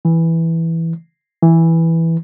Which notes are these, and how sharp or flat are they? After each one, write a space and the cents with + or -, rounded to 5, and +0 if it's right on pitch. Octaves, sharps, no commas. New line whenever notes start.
E3 -5
E3 -5